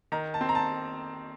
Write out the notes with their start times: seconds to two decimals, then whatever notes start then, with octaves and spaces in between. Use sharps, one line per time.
0.12 D#3 A#5
0.34 A5
0.41 C4
0.49 A#5
0.55 A5